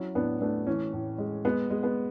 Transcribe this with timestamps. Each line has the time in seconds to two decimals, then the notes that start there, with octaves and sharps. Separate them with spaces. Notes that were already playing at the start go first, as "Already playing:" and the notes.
Already playing: F#3 C#4 E4
0.15 A2 B3 D4
0.41 A3 B3 D4
0.67 E3 C#4
0.93 A2
1.18 G#3
1.45 G#3 B3
1.70 G#3
1.83 B3